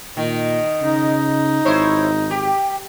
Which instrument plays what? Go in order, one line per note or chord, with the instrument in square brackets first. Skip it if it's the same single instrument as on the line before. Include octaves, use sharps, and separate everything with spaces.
[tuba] A#2 [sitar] D#3
[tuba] C#3 [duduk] D#4
[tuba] G#1 [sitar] E4 C5 C#5
[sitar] G4